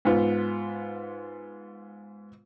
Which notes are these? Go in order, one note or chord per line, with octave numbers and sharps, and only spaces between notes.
G#2 B3 F4